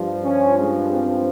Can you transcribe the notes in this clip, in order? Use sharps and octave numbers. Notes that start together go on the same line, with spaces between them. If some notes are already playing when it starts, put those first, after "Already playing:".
Already playing: G2 F3
C#4
G#3
C4